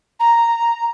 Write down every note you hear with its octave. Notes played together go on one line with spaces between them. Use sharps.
A#5